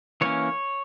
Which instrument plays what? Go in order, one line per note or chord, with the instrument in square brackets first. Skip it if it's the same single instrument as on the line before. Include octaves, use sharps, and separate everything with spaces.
[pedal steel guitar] E3 A#3 C#4 C#5